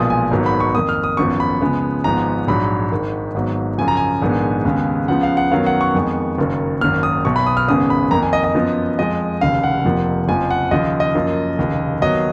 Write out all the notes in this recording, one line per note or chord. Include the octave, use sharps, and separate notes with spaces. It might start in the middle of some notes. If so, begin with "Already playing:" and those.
Already playing: B1 A#2 F3 G#3 B3 D#6
G#5
G#1 G#2 D#3 F#3 B3
B5
C#6
F2 D#3 A#3 D#6
F6
D#6
G#1 F#2 F3 B3 C#6
B5
C#2 C#3 F3 G#3 B3
G#1 G#2 F3 G#3 B3 A#5
A#1 G#2 F#3 B5
G#1 G#2 D#3
G#1 G#2 F#3 B3
F#2 C#3 F3 G#5
A#5
G#5
A#1 G#2 D#3 G#3 B3
D#2 C#3 G#3 B3
C#2 C#3 F3 B3 F#5
F5
F#5
F#2 D#3 F#3 B3 F5
F#5
C#6
F2 D#3 G#3 B3
F#1 F#2 D#3
G#1 F#2 D#3 A#3 F6
D#6
B1 B2 F#3 B3 C#6
B5
D#6
F6
G#1 F#2 C#3 G#3 B3 D#6
B5
F2 D#3 A#3 A#5
G#5
D#5
D#5
F#2 F3 B3
F2 F3 G#3 D#5
F1 D#2 C#3 F5
F#5
F1 F2 F3 A#3
F#1 F2 F3 G#5
F#5
D#2 C#3 F3 D#5
D#5
F#2 F3 A#3
F1 D#2 C#3
D#2 D#3 F#3 B3 D#5